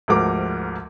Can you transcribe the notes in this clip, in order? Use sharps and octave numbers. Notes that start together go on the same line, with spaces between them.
D2 G#2 F3 A#4 D6